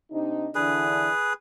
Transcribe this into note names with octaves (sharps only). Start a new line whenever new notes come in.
C3 D4 D#4
D3 E3 D4 G#4 B4